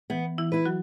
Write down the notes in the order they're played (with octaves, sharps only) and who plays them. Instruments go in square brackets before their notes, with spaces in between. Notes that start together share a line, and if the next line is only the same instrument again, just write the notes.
[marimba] E3 [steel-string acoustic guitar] B3
[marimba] E3 E4
[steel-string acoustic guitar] E4 B4
[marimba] F#3 F#4